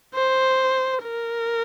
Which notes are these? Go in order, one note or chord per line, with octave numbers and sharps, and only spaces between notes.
C5
A#4